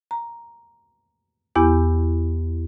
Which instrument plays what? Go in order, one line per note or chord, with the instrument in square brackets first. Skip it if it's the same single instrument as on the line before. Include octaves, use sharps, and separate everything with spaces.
[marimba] A#5
E2 B3 E4 G4 D6